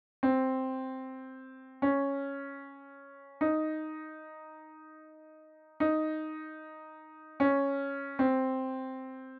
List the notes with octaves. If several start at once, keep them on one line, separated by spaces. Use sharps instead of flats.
C4
C#4
D#4
D#4
C#4
C4